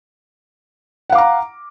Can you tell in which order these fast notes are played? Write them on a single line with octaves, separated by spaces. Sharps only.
F#5 F5 D6 A#5